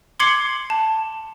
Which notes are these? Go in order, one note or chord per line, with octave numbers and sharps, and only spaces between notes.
C6 D6 G#6 C7 C#7 F#7
A5